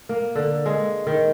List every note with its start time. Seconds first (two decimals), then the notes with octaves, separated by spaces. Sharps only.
0.09 A#3
0.36 D3
0.66 G#3
1.07 D#3